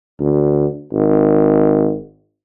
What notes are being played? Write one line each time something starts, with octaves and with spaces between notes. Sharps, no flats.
D2
G#1